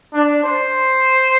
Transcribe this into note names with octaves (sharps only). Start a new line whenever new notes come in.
D4
C5